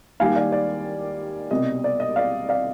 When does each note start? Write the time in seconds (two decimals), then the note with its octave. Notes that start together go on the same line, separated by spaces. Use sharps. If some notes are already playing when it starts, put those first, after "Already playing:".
0.20 D#2 D#3 G3 F5 G#5
0.35 D5 F5
0.52 D5
1.51 C2 B2 G3 D#5
1.84 D5
2.00 D#5
2.16 D5 F5
2.49 D5 F5